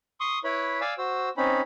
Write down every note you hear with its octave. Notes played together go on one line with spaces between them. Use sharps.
C6 C#6 D#6
E4 B4 C#5 B5
D5 F5 G#5 D6 E6
F#4 C5 E6
C4 C#4 D#4 B5